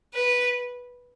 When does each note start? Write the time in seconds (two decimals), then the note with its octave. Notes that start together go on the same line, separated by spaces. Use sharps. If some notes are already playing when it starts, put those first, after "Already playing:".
0.14 B4